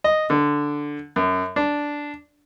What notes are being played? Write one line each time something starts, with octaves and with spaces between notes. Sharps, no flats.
D#5
D3
F#2
D4